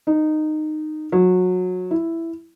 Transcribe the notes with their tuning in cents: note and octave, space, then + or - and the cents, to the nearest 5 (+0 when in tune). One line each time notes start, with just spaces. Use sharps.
D#4 -15
F#3 -20
E4 +5